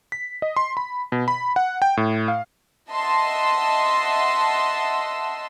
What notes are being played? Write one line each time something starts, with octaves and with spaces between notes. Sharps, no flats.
B6
D#5
C6
B5
B2
B5
F#5
G5
A2
F5
D#5 E5 F#5 A5 C6 E6